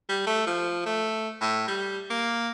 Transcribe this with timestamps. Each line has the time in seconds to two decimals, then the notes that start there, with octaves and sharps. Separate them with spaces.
0.09 G3
0.26 A3
0.47 F3
0.86 A3
1.41 A2
1.68 G3
2.10 A#3